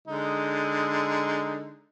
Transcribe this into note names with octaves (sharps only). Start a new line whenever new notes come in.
D3 G#3 D#4